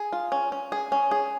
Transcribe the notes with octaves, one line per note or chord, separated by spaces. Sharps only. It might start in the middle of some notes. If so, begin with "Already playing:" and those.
Already playing: G#4
F4
C#4
C#4
G#4
C#4
G#4